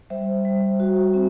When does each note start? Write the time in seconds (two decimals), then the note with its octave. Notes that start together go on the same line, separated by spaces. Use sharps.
0.10 G3 C5 E5
0.45 G3
0.80 F#4
1.14 C4